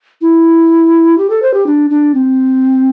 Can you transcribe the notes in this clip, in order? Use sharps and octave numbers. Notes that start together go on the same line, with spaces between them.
E4
G4
A4
C5
G4
D4
D4
C4